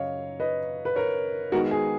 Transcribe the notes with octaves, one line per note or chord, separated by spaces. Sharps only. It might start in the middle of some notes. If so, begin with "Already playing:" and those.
Already playing: F#2 C#3 F#3 C#5 D#5 F5
B4 D#5
B4
A#4 C#5
D#3 G#3 B3 F#4 A#4
G#4